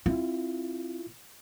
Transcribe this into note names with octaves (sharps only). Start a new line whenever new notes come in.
C4 E4 F4